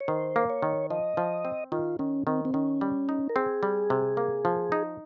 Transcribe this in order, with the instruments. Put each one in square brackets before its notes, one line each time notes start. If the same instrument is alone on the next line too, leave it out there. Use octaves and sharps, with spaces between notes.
[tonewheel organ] C#5
[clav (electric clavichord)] D#3 [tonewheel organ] C5
[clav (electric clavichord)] A#3
[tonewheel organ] C#5
[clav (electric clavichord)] D#3
[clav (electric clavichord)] F3 [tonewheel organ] D#5
[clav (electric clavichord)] F3
C4
[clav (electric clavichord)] D#3 [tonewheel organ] F4
[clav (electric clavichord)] D#3 [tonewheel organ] C#4
[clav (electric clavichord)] D#3 [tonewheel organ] C4
[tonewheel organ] C4
[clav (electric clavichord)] D#3 [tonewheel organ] C#4
[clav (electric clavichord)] G3
D#4
[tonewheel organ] A#4
[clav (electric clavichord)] C4 [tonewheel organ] G#4
[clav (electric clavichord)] G3
C3
A#3
F3
D#4